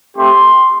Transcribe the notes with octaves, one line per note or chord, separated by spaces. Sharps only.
A3 C4 G4 C6